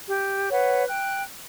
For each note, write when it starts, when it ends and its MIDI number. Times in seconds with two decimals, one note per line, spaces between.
0.07 0.47 67
0.51 0.84 71
0.51 0.84 73
0.51 0.84 78
0.88 1.23 79
0.88 1.23 90